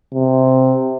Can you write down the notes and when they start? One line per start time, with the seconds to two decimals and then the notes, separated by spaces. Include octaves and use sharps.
0.14 C3